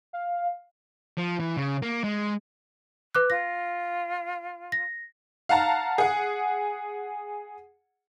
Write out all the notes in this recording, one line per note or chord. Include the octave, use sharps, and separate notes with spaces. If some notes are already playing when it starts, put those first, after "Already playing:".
F5
F3
E3
C#3
A#3
G#3
B4 D6 F#6
F4 A#6
A#6
F5 F#5 A5 A#5
G#4 F#5